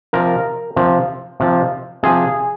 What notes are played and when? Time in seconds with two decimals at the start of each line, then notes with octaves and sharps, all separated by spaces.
0.13 C3 F3 A#4
0.76 C3 F3
1.40 C3 F3
2.03 C3 F3 G#4